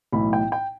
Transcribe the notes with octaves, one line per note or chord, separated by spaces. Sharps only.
B1 A2 E3 B5
G5
G5